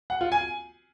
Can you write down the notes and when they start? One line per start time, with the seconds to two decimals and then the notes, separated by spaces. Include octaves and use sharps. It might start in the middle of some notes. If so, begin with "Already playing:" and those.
0.10 F#5
0.21 F4
0.32 G#5